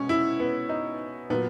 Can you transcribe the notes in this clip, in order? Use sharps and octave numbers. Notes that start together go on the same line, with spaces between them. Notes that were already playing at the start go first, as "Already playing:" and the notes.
Already playing: B2 G#3 C#4
E4
B3
D#4
A#2 F#3 B3